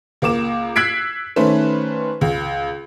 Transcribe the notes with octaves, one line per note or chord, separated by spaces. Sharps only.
C#2 A#3 D6 E7
E6 F#6 G#6 B6 C7 D7
D#3 A3 C#4 B4 C5
C#2